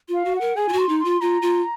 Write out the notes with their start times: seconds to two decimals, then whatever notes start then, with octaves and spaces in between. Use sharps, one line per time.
0.08 F4
0.14 F5
0.25 F#4
0.36 F#5
0.41 A#4
0.56 G#4 G#5
0.69 F4
0.73 F#4
0.78 C6
0.89 D#4
1.00 C6
1.05 F4
1.21 F4 A#5
1.42 F4